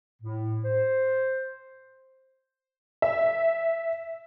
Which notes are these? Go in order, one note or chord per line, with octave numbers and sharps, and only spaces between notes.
A2
C5
E5